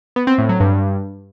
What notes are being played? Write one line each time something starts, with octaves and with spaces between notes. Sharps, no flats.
B3
C4
A2
F#3
G2